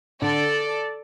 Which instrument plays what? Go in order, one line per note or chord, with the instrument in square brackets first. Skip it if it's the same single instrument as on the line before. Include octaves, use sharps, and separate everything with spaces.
[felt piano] D3 [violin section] A4 D5